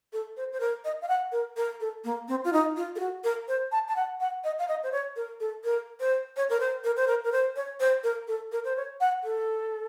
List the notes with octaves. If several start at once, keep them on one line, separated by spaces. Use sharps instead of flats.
A4
C5
C5
A#4
D#5
F5
F#5
A#4
A#4
A4
A#3
C4
F4
D#4
F4
A4
F#4
A#4
C5
A5
A5
F#5
F#5
D#5
F5
D#5
C5
C#5
A#4
A4
A#4
C5
C#5
A#4
C5
A#4
C5
A#4
A#4
C5
C#5
C5
A#4
A4
A#4
C5
C#5
F#5
A4